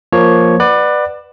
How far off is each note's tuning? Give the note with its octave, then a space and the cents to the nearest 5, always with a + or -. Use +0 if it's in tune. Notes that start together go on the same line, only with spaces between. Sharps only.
F3 +0 A#3 +0 C#5 +0
B4 +0 D5 +25 F#5 +0